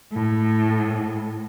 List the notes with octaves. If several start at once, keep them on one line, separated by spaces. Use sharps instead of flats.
A2